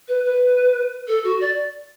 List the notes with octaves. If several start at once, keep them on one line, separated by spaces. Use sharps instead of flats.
B4
B4
A4
F#4
D5